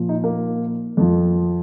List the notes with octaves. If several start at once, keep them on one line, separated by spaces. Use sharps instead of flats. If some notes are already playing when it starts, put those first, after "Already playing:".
Already playing: A#2 F3
D#4
A#3
F2 F3